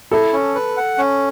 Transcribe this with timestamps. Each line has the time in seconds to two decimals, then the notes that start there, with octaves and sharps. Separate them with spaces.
0.12 E4 A4
0.33 C#4
0.55 B4
0.77 F#5
0.98 C#4